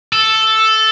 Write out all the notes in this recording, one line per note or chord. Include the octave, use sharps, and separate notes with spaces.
A4